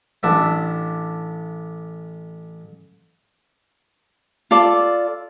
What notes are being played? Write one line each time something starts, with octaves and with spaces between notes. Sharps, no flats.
A1 D4 E5
F4 A4 D5